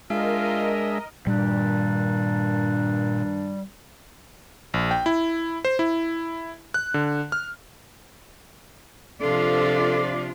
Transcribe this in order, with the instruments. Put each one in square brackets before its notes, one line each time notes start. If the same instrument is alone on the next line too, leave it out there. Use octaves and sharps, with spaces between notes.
[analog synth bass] G#3 [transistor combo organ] D4 G#4 E5 [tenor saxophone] F4 [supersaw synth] A#4 D#5
[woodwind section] G2 D#3 D4 [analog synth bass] A#2 [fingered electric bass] G3
[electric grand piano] A#1
G5
E4
C5
E4
F#6
D3
F6
[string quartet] C3 F3 [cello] D4 F4 [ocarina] A4 [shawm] D5